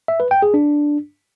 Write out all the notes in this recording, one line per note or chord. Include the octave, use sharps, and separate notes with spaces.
E5
B4
G5
G#4
D4